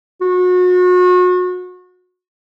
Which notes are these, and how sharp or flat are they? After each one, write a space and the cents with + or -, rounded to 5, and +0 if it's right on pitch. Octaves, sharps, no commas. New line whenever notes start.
F#4 -35